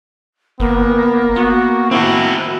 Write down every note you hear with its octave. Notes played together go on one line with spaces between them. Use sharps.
G1 A#3 B3
B3 F#4
C4 E4 F#4